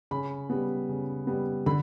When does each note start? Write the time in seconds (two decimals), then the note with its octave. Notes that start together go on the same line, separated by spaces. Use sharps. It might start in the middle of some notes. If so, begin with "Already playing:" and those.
0.11 C#3 B5
0.50 G3 B3
0.89 C#3
1.27 G3 B3
1.66 D3 B5